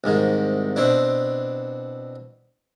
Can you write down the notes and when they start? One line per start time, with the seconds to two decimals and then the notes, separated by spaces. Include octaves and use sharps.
0.04 C2 G#2 D#3
0.76 B2 C4 D4 E4